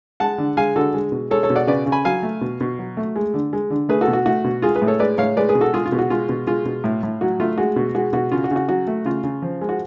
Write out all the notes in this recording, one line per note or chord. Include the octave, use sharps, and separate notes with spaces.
G#3 F#5 A5
D3
G#3 F5 G#5
D3 F#4 A4
G#3
B2
G#3 A4 C#5
A4 C#5
B2
D5 F#5
C#3 B4 D5
C#3
G#5 B5
F#3 F5 G#5
A3
B2
B2
F#3
A3
G#3
D3
G#3
D3
A3 G#4 B4
F#4 A4
B2
F#4
A3 F#4
B2
G#3 F4 G#4
G#4 B4
A2
A4 C#5
G#3 B4 D5
A2 C#5 F5
G#3 B4 D5
G#4 B4
B2
F#4 A4
G#3 F4 G#4
F4
B2
F#4
G#3 F4
B2
G#3 F4
B2
A2
A2
F#3 F#4
A3 F4
G#3 F#4
B2
G#3 F#4
B2 F#4
C#3 F4
F#4
C#3
F#4
F#3 F#4
A3
C#3 F4
C#3
F3
G#3
F#4